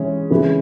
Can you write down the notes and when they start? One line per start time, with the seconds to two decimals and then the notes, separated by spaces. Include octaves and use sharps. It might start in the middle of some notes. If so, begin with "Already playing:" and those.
Already playing: E3 G#3 C#4
0.31 C#3 E3 G#3 B4